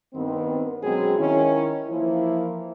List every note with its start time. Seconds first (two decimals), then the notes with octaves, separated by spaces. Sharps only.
0.14 G2 D#3 B3 C4
0.83 B2 F#3 G#3 C4 C#4 G#4
1.18 D#3 C#4 E4
1.89 E3 F3 A#3 E4